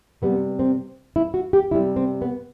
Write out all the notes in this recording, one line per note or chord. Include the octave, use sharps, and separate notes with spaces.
C3 G3 B3
C4
E4
F#4
G4
C3 G3 E4
C4
B3